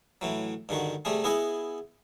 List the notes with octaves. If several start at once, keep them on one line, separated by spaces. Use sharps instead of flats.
A2 E3 F#3
G2 D3 D#3 F#4
C3 G3 A3 G#4
B3 E4 G#4 D#5 F#5 G#5